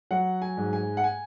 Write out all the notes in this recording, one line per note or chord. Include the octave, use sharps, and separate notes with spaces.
F#3 F#5
G#5
G#2
G#5
F#5
G#5